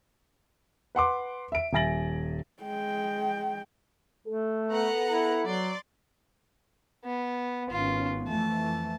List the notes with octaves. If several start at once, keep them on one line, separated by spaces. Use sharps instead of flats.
B4 F#5 C6 D6
E5 D7
D#1 E5 G#5 A6 A#6 F#7
G#3 G5
A3 A4
B3 F#5 A#5
E4
F#3 D5 C6
B3
G#1 B3 C#4 F4
F2 E3 A3 A5